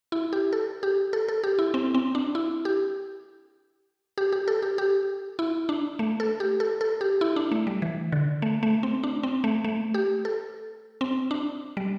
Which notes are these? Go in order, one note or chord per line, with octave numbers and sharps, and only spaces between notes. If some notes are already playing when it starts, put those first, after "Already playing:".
E4
G4
A4
G4
A4
A4
G4
E4
C4
C4
D4
E4
G4
G4
G4
A4
G4
G4
E4
D4
A3
A4
G4
A4
A4
G4
E4
D4
A3
G3
E3
D3
A3
A3
C4
D4
C4
A3
A3
G4
A4
C4
D4
G3